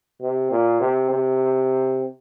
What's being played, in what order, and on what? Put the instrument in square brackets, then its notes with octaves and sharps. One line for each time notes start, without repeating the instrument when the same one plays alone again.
[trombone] C3
A#2
C3
C3